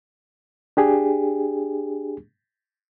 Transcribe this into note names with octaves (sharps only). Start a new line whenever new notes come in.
D4 G4 G#4